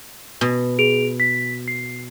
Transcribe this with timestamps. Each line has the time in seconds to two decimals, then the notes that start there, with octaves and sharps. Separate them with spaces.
0.41 B2
0.79 G#4 D7 F7
1.20 B6
1.68 C7